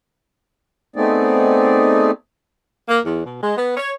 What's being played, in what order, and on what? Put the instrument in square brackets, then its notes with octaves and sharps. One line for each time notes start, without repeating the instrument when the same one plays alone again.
[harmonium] A3 B3 C4 D#4 G#4 D5
[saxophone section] A#3
E2
B2
G#3
B3
C#5